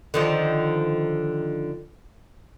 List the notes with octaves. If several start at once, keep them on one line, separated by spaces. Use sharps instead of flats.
D3 D#3 F3